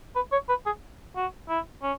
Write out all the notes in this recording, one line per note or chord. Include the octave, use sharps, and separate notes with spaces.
B4
C#5
B4
G#4
F#4
E4
C#4